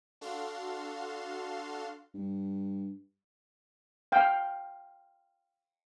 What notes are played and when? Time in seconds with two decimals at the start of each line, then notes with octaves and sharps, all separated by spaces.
0.21 D4 F#4 A4 F5 C6
2.14 G2
4.12 F5 G5